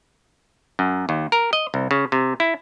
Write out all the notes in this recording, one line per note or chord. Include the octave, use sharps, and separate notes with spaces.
F#2
D#2
A#4
D#5
C2
C#3
C3
E4